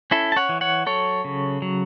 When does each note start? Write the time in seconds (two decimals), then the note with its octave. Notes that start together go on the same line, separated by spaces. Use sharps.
0.11 C#4 E4 A4
0.32 A5
0.36 C#5 F#5
0.49 E3
0.61 C#5 F#5
0.86 F#3 A4 C#5
1.25 C#3
1.62 F#3